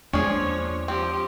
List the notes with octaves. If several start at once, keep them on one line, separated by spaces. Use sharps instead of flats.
E2 F3 G#3 A#3 C#4 D4 G#4 C#5
F3 C4 G4